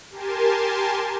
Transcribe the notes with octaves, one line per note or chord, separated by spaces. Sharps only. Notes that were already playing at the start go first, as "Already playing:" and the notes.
G4 A#4 G#5 A5 C6